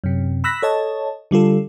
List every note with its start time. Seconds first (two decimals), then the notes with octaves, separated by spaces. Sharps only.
0.04 F#2 C3
0.44 B5 E6 F#6 A#6 B6
0.62 A4 C#5 D#5 A5
1.31 D3 G3 F4 A4